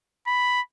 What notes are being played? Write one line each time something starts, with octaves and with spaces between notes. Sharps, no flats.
B5